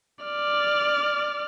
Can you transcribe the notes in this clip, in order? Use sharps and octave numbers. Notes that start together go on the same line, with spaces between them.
D5 F6